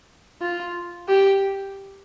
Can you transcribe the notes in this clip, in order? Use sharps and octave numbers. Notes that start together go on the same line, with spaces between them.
F4
G4